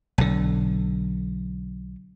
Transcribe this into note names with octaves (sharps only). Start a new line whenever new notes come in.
B1 D3